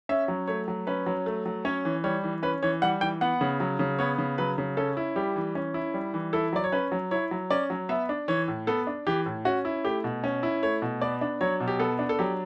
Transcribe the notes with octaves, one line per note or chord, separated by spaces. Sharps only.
C#4 E5
F#3
A3 C#5
F#3
C#4 B4
F#3
A3
F#3
C#4 C#5
E3
G3 C#5
E3
C#4 B4
E3 C#5
G3 F#5
E3 G5
B3 F#5
C#3
F#3
C#3
B3 C#5
C#3
F#3 B4
C#3
C#4 A4
E4
G3 G4
E3
C#4
E4
G3
E3
E4 A4
F#3 D5
C#5
C#4 B4
F#3
E4 C#5
F#3
C#4 D5
F#3
B3 E5
D4
E3 C#5
A2
B3 A4
D4
E3 G4
A2
C#4 F#4
E4
A3 G4
B2
C#4
E4
A3 C#5
B2
B3 D5
D4
F#3 C#5
B2
G4
B3 A4
D4
A4
F#3 G4